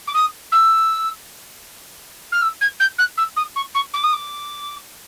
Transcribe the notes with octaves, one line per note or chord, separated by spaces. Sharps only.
D6
D#6
E6
F6
E6
G#6
G6
F#6
E6
D#6
C#6
C#6
D6
D#6
D6